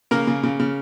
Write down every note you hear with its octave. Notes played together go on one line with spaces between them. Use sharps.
C#3 A#3 A#4
C#3
C#3
C#3